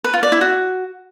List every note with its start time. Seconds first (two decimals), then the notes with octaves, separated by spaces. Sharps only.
0.04 B4
0.14 F4
0.23 D5
0.32 E4
0.41 F#4